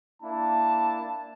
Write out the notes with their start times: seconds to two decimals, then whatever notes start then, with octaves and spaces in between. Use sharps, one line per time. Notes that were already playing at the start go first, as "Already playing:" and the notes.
0.22 A#3 D4 E4 A5